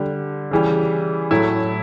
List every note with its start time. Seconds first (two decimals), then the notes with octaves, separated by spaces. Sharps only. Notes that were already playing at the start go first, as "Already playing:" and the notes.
Already playing: D3 G3
0.51 C#3 E3 G3
1.31 A2 F#3 A3 E4